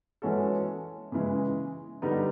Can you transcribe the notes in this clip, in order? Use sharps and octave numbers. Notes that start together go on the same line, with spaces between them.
E3 G#3 C#4 F#4 A4
C#3 E3 G#3
D3 G3 B3 D#4